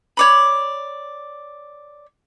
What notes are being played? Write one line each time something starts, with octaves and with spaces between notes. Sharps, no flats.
C#5 D5 B5